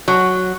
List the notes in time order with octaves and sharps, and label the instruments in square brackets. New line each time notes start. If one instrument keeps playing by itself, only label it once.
[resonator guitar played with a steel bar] F#3